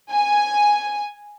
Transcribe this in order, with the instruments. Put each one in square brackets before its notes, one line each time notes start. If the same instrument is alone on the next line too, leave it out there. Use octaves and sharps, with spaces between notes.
[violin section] G#5